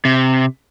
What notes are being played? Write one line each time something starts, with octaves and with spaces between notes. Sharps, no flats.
C3